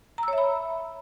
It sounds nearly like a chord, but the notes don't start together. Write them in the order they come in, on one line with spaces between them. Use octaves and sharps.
A#5 E6 C#5 E5 B5